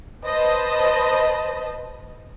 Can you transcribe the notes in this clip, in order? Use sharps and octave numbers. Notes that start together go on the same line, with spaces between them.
B4 C5 D#5 A5